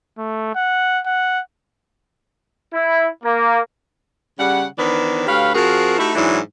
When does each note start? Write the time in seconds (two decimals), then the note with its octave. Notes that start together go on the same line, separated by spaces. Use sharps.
0.18 A3
0.55 F#5
1.06 F#5
2.73 E4
3.24 A#3
4.39 C#3 G3 F#5
4.78 D#3 E3 B3 D4 B4 C5
5.27 D2 G4 B4 C#5 F5
5.54 F3 C4 F#4 G#4 A#4
5.98 A3 D#4 E4 F#4 G4 A4
6.15 G#2 E3 F#3 D4 E4